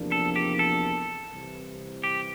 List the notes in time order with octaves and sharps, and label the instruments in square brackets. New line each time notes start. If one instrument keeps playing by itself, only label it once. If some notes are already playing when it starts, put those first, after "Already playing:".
Already playing: [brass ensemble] E2 C3 F3 A#3 D4
[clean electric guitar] A4
G4
A4
[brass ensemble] C2 C3 E3
[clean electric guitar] G4